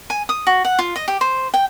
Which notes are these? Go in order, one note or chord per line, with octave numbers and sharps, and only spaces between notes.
G#5
D#6
F#4
F#5
F4
D#5
G4
C5
G5